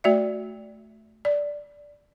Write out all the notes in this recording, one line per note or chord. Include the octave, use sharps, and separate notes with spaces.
A3 F#4 D5 E5
D5